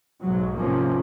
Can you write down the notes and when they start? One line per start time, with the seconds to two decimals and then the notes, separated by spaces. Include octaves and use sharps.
0.22 B1 G#2 F#3
0.56 G#2 C3 F3 A#3 C#4